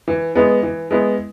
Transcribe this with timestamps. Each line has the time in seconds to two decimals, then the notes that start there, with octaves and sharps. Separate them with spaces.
0.08 E3
0.35 G#3 B3 E4
0.63 E3
0.91 G#3 B3 E4